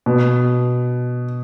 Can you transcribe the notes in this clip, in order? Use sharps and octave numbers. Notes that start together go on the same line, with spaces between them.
B2